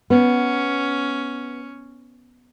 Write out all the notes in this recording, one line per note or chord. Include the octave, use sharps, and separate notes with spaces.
B3 C#4